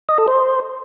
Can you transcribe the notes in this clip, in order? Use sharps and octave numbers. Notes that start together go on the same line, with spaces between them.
D#5
A4
C5